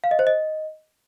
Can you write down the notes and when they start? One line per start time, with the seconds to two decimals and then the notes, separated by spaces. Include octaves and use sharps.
0.04 F5
0.11 D#5
0.19 C5
0.27 D#5